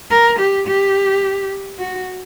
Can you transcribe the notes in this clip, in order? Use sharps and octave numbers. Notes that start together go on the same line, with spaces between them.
A#4
G4
G4
F#4